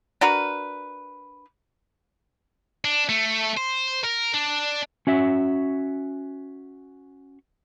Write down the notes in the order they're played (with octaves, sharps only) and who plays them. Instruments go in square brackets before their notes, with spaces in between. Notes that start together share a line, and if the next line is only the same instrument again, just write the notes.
[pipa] D4 F#4 A#4 B4
[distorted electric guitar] D4
A3
C5
A#4
D4
[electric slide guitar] C#4 F#4 E5